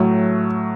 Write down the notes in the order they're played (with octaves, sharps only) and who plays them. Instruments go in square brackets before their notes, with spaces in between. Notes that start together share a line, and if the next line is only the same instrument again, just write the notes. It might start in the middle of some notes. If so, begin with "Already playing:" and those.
Already playing: [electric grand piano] A2 F#3 A3